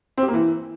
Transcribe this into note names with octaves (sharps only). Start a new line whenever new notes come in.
C4
G4
A#3
E3